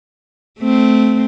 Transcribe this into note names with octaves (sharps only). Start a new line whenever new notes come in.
A3 C4